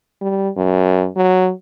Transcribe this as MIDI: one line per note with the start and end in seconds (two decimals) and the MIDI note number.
0.21 0.49 55
0.57 1.08 42
1.16 1.51 54